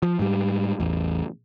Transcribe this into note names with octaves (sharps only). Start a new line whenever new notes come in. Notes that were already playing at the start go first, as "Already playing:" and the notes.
F3
G#2 G3
A1 E2